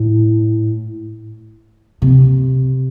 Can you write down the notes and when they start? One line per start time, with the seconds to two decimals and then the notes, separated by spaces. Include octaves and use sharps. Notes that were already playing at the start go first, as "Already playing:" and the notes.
Already playing: A2
2.02 C3